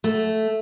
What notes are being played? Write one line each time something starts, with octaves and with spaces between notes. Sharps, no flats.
A3